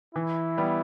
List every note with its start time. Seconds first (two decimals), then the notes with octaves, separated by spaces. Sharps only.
0.15 E3 E4
0.58 G3 B3